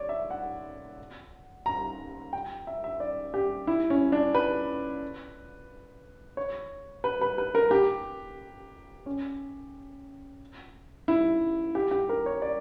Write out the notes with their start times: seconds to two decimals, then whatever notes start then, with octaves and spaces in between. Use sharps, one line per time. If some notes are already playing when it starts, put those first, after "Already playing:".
Already playing: C#5 D5
0.09 E5
0.30 F#5
1.66 A#5
2.33 G5
2.67 E5
2.84 E5
3.00 D5
3.34 G4
3.67 E4
3.90 C#4
4.12 D4
4.35 B4
6.37 C#5
7.04 B4
7.21 B4
7.38 B4
7.55 A#4
7.71 G4
9.06 C#4
11.08 E4
11.75 G4
11.91 G4
12.09 A#4
12.26 C#5
12.42 D5